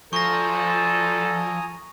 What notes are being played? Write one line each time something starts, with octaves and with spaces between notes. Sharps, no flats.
D2 F3 A4 G#5 A#5 C#6 D#6 A#6